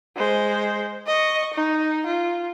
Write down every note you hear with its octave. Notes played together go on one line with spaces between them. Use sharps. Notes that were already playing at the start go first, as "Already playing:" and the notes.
G#3 C5
D#5 C#6
D#4
F4